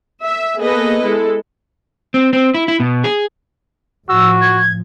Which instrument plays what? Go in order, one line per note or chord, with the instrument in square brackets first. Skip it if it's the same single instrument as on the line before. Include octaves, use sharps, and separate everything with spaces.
[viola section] E5
A#3 B3 G#4 A4 B4 D#5
G#3 E4 A4
[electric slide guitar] C4
C4
E4
E4
B2
G#4
[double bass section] A2 F3 [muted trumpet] F#4 [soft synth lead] E6
[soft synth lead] G#6